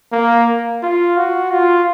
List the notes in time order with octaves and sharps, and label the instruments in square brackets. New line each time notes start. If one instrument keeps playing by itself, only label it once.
[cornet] A#3
F4
F#4
F4